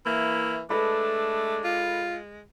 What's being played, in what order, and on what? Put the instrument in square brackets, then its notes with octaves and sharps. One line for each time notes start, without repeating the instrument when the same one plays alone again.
[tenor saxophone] E3 [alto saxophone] A#3 [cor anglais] E4
[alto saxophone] G#3 [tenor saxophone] A3 [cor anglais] D4 [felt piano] A4 B4 B5
[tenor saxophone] F4